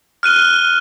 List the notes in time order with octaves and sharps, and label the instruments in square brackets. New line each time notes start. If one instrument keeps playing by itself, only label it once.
[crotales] F6 F#6 D#7 G7